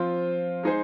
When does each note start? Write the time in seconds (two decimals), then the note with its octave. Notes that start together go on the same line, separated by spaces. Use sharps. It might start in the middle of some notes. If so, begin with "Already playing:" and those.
Already playing: F3 C4 F4 C5
0.63 G#3 D#4 G#4 C5